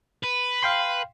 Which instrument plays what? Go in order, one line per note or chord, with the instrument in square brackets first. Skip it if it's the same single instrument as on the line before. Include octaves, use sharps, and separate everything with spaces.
[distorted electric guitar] B4
[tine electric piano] F5 G5 C6